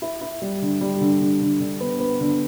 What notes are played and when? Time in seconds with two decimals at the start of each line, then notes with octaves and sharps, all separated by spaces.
0.02 E4
0.21 E4
0.42 G3
0.62 D3
0.81 G3
1.01 D3
1.20 D3
1.41 D3
1.60 D3
1.80 B3
2.00 B3
2.20 D3